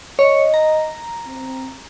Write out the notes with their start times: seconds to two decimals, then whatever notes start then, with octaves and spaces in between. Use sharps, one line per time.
0.19 C#5 D#5
0.54 A#5
1.27 C4